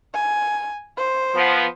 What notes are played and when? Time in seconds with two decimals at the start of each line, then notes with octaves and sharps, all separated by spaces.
0.15 G#5
0.98 C5
1.35 F3 B3